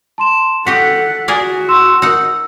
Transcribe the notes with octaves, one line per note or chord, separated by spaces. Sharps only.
A5 C6 E7
F#4 G4 A4 D#5 F#5 B6
F#4 G#4 A#4 D5
C6 E6 E7
D#4 A#4 F#5 E6